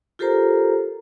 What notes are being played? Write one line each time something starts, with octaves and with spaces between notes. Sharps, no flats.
F4 G4 A4 A#4 C5 A#5